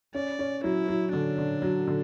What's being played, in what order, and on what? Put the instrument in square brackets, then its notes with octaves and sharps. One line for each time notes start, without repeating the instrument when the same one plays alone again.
[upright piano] C#4 [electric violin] D5
[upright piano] C#4
[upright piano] F#3 [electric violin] E4
[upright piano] F#3
[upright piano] D3 [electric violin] D4
[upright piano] D3
F#3
D3